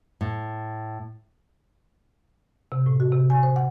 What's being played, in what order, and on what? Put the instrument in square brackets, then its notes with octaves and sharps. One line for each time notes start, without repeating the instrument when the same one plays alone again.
[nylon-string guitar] A2
[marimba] C3
A2
F#4
C3
G#5
C5
F#5